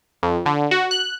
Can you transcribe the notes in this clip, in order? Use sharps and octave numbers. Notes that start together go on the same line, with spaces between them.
F2
D3
F#4
F#6